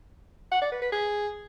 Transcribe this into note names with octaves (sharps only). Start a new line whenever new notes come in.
F#5
D5
B4
B4
G#4